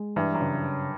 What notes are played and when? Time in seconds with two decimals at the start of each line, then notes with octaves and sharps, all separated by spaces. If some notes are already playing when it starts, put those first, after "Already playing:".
Already playing: G#3
0.16 G2 E3
0.34 F#2
0.41 C#3